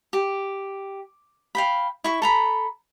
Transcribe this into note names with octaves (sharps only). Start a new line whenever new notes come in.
G4
F5 G5 B5
E4 C#6
A4 A#5 B5